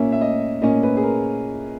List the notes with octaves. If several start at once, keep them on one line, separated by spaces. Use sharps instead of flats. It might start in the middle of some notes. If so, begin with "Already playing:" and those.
Already playing: A#2 A#3 C#4 E5
E5
D#5
A#2 A#3 C#4 D#5
B4
G#4
A#4